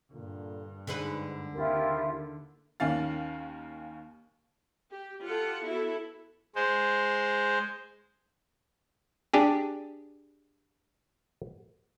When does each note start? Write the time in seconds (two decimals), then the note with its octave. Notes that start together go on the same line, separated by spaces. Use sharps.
0.12 G2 A#2 D3
0.87 G#2 D3 G#4 B4
1.54 D#2 C3 E4 F4 G4 A#4
2.80 D#2 D#3 C#4 F5 A6
4.91 G4
5.24 F4 G4 A4 F#5
5.63 B3 E4 F#4 A4
6.55 G#3 C5
9.34 D4 G4 G#4